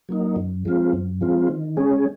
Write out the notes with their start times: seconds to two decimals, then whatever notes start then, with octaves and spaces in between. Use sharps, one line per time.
0.09 F#3 A#3 D#4
0.36 F#2
0.65 F3 G#3 C4 F4
0.93 F#2
1.21 F3 G#3 C4 F4
1.48 D#3
1.77 G#3 C#4 G#4